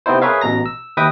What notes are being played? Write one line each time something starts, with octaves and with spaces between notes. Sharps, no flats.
C3 B3 C4 D#4 E4 C5
G#4 A#4 B4 C#5 E5 F5
A1 B2 A#5 A#6
E6
D#2 B4 D#5 E5 G5 D#6